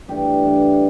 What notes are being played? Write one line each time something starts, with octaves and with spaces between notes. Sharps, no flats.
G2 E3 A3 D4 G4
G2 E3 A3 D4